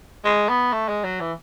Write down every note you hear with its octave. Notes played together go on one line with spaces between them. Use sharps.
G#3
B3
A3
G#3
F#3
E3